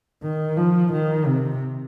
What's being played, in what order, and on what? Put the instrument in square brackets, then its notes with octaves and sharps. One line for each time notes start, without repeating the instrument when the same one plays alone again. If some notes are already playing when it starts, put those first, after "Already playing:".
[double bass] D#3
F3
D#3
C3